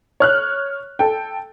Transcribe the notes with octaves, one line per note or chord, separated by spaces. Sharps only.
C#5 F6 F#6
A4 G5